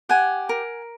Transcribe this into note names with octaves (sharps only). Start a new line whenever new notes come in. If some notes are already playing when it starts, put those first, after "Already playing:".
G4 F#5 G#5
A#4